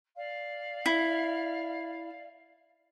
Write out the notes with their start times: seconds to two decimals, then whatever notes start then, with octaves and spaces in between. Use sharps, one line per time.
0.16 D5 F5
0.86 E4